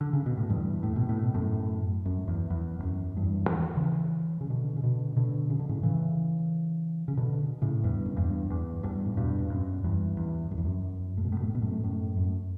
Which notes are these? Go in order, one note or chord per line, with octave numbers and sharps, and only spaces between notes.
D3
C#3
B2
A2
E2 G2
A2
B2
A2
B2
F#2 A2
F#2
E2
E2
E2
F#2
E2 G2
E3
C#3 E3
C#3
B2 D3
C#3
B2 D3
B2 D3
C#3
D3
A2 C#3
C#3 E3
C#3
B2 D3
A2 C#3
E2 G2
F#2
E2 G2
E2
E2 G2
A2
G2 B2
E2
F#2
E2 G2
E2
F#2
E2
F#2
A2
B2
A2
B2
A2
B2
F#2 A2
F#2 A2
F#2